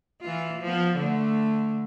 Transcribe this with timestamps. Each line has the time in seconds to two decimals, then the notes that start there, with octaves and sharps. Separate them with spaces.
0.21 E3 F4
0.61 F3 B3
0.96 D3 A3